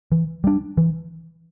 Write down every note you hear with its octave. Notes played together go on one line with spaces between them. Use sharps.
E3
G3 D4
E3